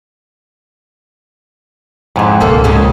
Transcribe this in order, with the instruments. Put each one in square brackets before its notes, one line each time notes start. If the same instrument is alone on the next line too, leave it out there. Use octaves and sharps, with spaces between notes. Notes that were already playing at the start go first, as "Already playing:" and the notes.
[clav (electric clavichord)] F2 G#2 [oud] C#3 E3
[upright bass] C#2 F#2 [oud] B2 A#3 A4
[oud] A#2 C#3 G#3